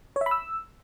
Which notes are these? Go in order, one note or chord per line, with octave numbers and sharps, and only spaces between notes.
C#5
E5
B5
E6